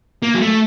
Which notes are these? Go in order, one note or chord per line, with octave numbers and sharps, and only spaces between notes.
A#3
F#3
A3